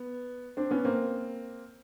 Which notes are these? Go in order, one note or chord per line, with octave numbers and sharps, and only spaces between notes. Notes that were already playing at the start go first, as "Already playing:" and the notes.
Already playing: B3
C4 D4
B3 C#4
A#3 C4